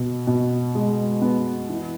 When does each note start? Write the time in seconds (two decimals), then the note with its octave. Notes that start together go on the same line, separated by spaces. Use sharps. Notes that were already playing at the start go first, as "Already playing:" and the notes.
Already playing: B2
0.27 B2
0.75 G#3
1.22 B3
1.69 E3